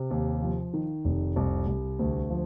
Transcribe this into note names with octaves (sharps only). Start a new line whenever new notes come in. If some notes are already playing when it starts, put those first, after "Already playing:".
Already playing: C3
D#2
F3
D#3
F1
C2
C2
D2
F3